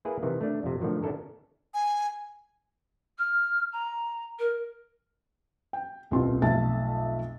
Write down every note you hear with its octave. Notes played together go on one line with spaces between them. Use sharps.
A#3 E4 G#4 A#4 B4
C3 D#3 E3
A3 D4
F2 C3
A2 D3 D#3 F3 F#3
C#4 D4 E4 A4 A#4
G#5
F6
A#5
A#4
G5
D#1 C2 B2 C4 F4 C6
B1 F2 A3 E5 A5 A6